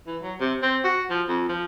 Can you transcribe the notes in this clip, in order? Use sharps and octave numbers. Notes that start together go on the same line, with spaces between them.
E3
F#3
C3
C4
F#4
F3
F2
F3